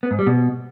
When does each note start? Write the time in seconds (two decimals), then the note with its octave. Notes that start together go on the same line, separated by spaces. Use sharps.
0.03 B3
0.11 G#2
0.19 G3
0.27 B2